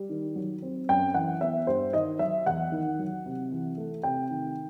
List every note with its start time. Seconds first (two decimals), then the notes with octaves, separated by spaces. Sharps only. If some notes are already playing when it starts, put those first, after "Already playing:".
Already playing: G3
0.10 D#3
0.36 F#3
0.62 C4
0.89 F#2 G5
1.14 E3 F#5
1.41 B3 E5
1.67 G2 C5
1.93 D#3 D#5
2.19 F#3 E5
2.46 E2 F#5
2.72 D#3
2.99 F#3
3.26 C3
3.52 E3
3.78 A3
4.03 C3 G5
4.30 D#3